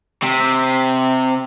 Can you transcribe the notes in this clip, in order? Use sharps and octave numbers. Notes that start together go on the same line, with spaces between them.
C3